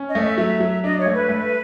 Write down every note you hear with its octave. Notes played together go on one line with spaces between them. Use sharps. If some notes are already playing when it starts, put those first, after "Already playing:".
Already playing: C#4
D#5
A3
E5
F#3 E5
F#3
D4 D#5
C#5
A3
B4
A3